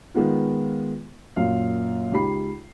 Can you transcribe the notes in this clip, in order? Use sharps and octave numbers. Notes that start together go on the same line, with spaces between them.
D#3 G#3 B3 F4
F#2 A#2 F5
C#2 D#4 G4 B5 C7